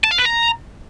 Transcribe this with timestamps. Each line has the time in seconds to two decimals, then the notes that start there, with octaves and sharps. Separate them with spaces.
0.04 A5
0.11 F5
0.18 B4
0.25 A#5